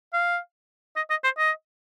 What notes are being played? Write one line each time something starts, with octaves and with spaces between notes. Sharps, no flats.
F5
D#5
D#5
C5
D#5